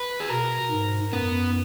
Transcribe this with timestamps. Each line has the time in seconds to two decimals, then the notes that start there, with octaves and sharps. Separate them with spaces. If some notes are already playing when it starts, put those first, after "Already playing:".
Already playing: B4
0.20 G#4
0.30 B2 A#4
0.71 G#2
1.12 F#2 B3